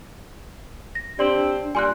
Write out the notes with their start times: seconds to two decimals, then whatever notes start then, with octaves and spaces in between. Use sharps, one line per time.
0.95 A#6
1.19 C4 D4 G4 D5 C6 F#7
1.75 A#2 G3 G#5 C6 F#6